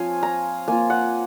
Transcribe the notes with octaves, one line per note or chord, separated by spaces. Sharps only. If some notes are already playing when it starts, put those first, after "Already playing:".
Already playing: F3 C4 C#5 F5 G#5
A#5
A#3 F4 G#5
F#5